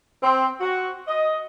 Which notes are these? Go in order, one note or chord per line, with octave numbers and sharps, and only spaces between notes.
C4
F#4
D#5